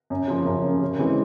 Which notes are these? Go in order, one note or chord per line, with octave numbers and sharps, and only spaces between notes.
F#2
C#3 F3 A#3
F#2
C#3 F3 A#3
C#3
E3 G#3 C4